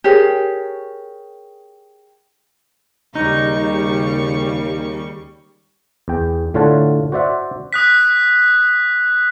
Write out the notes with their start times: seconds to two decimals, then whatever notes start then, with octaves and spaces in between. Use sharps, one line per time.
0.04 G4 G#4 A#4 C#5
3.15 D#2 C#3 G3 D#4 C#6
6.08 E2 G5
6.54 A2 D3 F4 C#5 F#5 A5
7.12 F#4 C5 D5 E5 F#5
7.73 D#6 F#6 B6